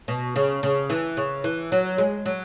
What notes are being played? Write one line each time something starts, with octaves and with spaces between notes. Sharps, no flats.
B2
C#3
C#3
E3
C#3
E3
F#3
G#3
F#3